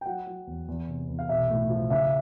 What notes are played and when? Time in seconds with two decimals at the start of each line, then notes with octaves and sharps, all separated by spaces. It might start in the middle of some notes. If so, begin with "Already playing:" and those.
0.01 G5
0.06 F#3 F#5
0.27 F#3
0.47 E2
0.68 E2
0.88 C3
1.09 E2
1.19 F5
1.29 B1 E5
1.50 A2
1.70 F3
1.90 C#3 E5